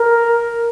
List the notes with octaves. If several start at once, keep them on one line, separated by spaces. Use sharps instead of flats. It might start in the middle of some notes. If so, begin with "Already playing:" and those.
Already playing: A#4